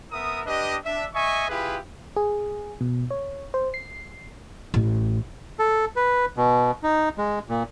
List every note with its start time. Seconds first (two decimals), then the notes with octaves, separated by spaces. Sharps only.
0.11 B3 A#4 E5 D#6
0.45 D4 G4 B4 D#5
0.84 D4 E5
1.13 D#5 E5 G#5 C#6
1.49 E4 F4 G4 G#4 B4
2.16 G#4
2.81 B2
3.11 C#5
3.54 C5
3.74 C7
4.74 A1
5.59 A4
5.96 B4
6.37 B2
6.83 D#4
7.18 G#3
7.49 A#2